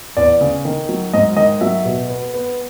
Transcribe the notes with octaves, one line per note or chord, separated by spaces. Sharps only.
E2 D5
C#3
D#3
F#3
G#2 D#5
D#3 D#5
F#3 E5
B2
B3
B3